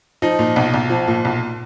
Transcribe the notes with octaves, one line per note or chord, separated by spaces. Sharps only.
F3 D#4
A#2
B1
B1
F3
A#2
B1